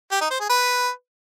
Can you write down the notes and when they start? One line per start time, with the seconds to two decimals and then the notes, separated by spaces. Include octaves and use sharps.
0.12 G4
0.21 D#4
0.31 C5
0.40 G#4
0.50 B4